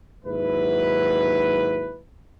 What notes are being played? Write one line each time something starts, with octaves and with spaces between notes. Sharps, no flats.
D#2 G#2 F#3 E4 B4